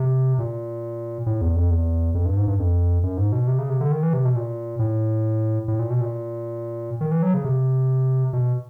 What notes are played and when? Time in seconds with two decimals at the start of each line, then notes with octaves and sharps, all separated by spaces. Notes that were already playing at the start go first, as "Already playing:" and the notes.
Already playing: C3
0.38 A#2
1.26 A2
1.41 E2
1.56 F2
1.71 E2
2.15 F2
2.26 G2
2.37 G#2
2.47 G2
2.59 F2
3.03 F#2
3.17 G#2
3.32 B2
3.47 C3
3.58 C#3
3.70 C3
3.80 D3
3.92 D#3
4.03 E3
4.13 C3
4.25 B2
4.36 A#2
4.79 A2
5.68 A2
5.79 A#2
5.90 B2
6.01 A#2
7.01 D#3
7.11 E3
7.23 F#3
7.34 C#3
7.44 C3
8.33 B2